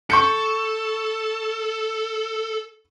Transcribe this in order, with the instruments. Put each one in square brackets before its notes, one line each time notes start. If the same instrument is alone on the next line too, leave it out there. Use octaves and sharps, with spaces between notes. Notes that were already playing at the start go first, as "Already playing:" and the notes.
[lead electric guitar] A4 [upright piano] C#6 G6 C#7